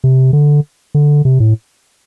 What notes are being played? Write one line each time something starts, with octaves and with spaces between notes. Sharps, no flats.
C3
D3
D3
C3
A2